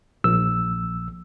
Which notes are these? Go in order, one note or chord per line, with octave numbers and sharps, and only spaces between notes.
A#1 E6